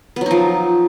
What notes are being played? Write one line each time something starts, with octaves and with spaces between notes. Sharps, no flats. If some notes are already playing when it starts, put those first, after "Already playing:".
F3 F#3 B3 D#4